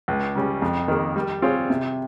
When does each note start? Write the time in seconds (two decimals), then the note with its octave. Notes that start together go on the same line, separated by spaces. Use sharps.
0.08 C#2
0.35 C#3 G3 C#4
0.62 F2
0.88 D#3 A#3
1.16 G3
1.42 C4 F4 G#4 C#5
1.70 C3